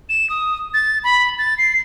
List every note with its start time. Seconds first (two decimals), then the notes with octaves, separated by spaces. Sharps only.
0.09 E7
0.30 D#6
0.74 A6
1.04 B5
1.39 A6
1.58 C7